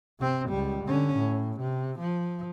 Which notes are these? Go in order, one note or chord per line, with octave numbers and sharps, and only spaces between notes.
C3 C4
C#2 G3
D3 C#4
A2
C3
F3